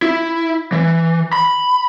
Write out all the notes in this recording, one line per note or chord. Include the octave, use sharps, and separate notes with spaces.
E4
E3
B5